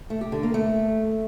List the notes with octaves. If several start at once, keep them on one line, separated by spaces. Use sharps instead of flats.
A3
G4
D3
A#3
A3